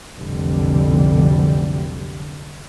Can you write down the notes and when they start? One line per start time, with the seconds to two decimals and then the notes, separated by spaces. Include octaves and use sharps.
0.16 F1 B1 D3 E3 G3